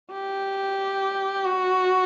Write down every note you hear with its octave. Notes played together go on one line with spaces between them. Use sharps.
G4
F#4